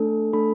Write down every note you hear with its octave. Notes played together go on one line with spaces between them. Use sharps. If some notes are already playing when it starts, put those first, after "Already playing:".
Already playing: A3 D4 A4
A3 D4 A4 B5